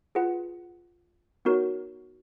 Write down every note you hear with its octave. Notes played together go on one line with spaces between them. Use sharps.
F4 G#4 B4 F#5
B3 D#4 F#4 A#4 C#5